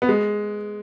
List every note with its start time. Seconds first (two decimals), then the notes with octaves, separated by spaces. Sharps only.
0.02 B3
0.09 G#3